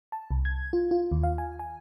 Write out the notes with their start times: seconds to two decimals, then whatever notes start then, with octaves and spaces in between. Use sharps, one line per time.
0.12 A5
0.31 C2
0.45 G#6
0.73 F4
0.91 F4
1.12 D#2
1.23 F5
1.38 G#5
1.59 G#5